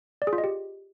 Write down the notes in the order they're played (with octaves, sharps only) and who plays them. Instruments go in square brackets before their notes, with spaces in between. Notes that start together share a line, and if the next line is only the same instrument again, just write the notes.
[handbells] D5
G#4
F4
D#5
G4